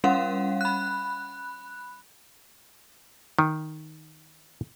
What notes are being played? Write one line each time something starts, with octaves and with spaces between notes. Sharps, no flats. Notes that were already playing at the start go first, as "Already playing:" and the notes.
G3 C#4 F5 F#5
B5 F#6
D#3